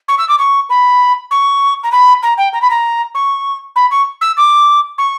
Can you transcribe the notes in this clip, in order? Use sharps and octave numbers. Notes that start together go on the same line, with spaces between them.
C#6
E6
D6
C#6
B5
C#6
A#5
B5
A#5
G5
A#5
B5
A#5
C#6
B5
C#6
E6
D6
C#6